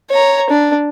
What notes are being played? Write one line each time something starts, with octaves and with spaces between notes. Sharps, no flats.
C#5 A#5
D4